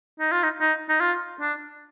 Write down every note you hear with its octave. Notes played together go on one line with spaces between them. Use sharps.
D#4
F4
D#4
D#4
D#4
F4
D4